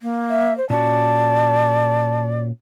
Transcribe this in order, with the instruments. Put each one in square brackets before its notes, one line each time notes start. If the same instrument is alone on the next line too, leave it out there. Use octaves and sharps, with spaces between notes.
[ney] A#3
[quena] E5
C5
[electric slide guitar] A#2 C#4 F#4 [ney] D5 [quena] A5